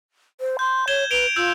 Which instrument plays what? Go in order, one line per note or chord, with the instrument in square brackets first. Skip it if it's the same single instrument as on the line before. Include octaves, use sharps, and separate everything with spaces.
[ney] C5
[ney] C6 [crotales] G6
[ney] C#5 [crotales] G#6 E7 G7
[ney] B4 [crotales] D7 F7 G7
[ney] F4 [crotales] E6 G6